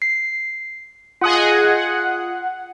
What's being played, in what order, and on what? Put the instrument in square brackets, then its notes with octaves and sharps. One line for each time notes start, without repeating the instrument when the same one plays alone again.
[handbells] C7
[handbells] F4 D#6 [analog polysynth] G#4 D#5 F#5
[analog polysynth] F#5